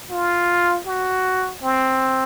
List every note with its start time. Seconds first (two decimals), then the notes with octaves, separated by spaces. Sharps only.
0.11 F4
0.86 F#4
1.63 C4